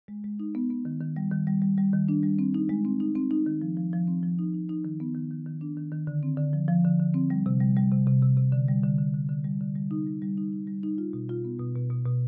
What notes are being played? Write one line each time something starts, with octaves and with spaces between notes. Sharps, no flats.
G#3
G#3
D#4
B3
B3
D#3
D#3
G3
D#3
G3
G3
G3
D#3
D4
G3
C4
D#4
G#3
C4
D#4
C4
D#4
D#3
F3
F3
F3
C4
F3
D#4
D#4
D#4
D#3
B3
D#3
D#3
D#3
D4
D#3
D#3
D3
C4
D3
F3
F3
D3
D3
C4
G3
C3
G3
G3
C3
C3
C3
C3
D3
G3
D3
D3
D3
D3
G3
D3
G3
D#4
G3
G3
D#4
D#4
G3
D#4
F4
B2
F4
B3
B2
B2
B2
B2